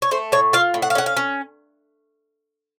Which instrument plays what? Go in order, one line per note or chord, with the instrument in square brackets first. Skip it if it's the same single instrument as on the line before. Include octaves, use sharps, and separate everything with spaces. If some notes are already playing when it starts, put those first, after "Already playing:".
[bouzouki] C#5
A3 C5
A2 C#5
F4 F5
A2
F#5
F5
C#4 F#5
F5
C#4